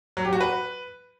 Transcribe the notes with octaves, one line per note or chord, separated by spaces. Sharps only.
F#3
G4
F#4
B4